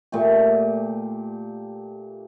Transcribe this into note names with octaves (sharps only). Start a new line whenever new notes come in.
A#2 A3 G4